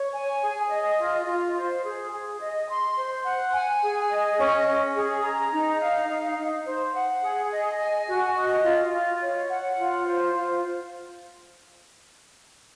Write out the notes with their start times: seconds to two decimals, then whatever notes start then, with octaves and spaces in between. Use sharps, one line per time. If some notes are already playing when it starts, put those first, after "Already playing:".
Already playing: C#5
0.13 G#5
0.42 G#4
0.70 D#5
0.99 F4
1.26 F4
1.55 C5
1.84 G#4
2.12 G#4
2.40 D#5
2.69 C6
2.96 C5
3.24 F#5
3.53 G#5
3.82 G#4
4.10 D#5
4.39 C#4
4.67 C#4
4.95 G#4
5.23 A#5
5.52 D#4
5.80 F5
6.09 D#4
6.37 D#4
6.66 C5
6.94 F#5
7.22 G#4
7.51 D#5
7.79 G#5
8.07 F#4
8.35 D#5
8.63 F4
8.93 F4
9.21 C#5
9.49 F#5
9.77 F4
10.05 C5
10.33 F4